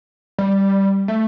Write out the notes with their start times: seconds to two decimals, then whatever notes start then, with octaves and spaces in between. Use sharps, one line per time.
0.38 G3
1.08 A3